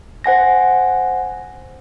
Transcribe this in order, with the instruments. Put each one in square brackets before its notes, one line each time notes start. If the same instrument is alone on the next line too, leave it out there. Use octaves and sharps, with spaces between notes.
[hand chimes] C5 F#5 G#5 A#6